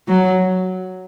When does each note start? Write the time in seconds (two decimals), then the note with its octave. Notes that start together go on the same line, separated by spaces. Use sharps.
0.08 F#3